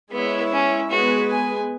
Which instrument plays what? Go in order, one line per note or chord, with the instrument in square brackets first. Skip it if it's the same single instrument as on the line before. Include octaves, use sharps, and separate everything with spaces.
[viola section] G#3 E4 C#5 E5 [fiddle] B3
[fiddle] C#4
[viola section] G#3 B3 G#4 B4 [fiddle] F#4
[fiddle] G#5